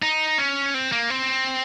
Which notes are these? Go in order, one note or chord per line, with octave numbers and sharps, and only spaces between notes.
D#4
C#4
C4
A#3
C4